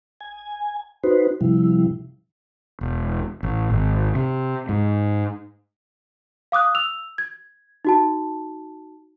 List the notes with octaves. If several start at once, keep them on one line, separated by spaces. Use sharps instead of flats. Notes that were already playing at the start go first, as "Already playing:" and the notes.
G#5
D#4 F#4 B4 C5
C3 F3 G3 E4
E1
A1
G#1
C3
G#2
F5 D6 D#6 F#6
E6 F7
G#6
D#4 F#4 A5